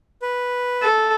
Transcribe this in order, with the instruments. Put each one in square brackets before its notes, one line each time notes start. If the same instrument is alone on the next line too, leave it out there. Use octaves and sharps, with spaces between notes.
[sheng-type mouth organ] B4
[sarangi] A4